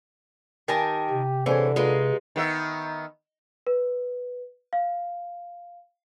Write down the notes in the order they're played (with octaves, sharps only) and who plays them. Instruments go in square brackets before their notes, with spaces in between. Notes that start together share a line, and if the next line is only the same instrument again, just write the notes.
[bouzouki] D#3 A#4 A5 [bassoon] G4 [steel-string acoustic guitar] G#5
[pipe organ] C3
[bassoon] D3 [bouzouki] E3 [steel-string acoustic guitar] C4 G#4 C#5
[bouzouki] G#3 D#4 [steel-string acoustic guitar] F4 B4
[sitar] D#3 B3 E5
[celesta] B4
F5